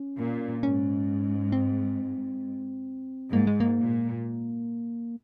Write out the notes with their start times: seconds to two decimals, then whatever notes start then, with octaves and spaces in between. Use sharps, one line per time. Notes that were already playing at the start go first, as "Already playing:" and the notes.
Already playing: C#4
0.18 A#2
0.63 G#2 C#4
1.52 C4
3.32 G#2 A#3
3.47 G#3
3.60 A#3
3.78 A#2